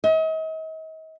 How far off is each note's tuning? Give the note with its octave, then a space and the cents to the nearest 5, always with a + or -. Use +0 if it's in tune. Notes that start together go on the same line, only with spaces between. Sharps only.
D#5 +40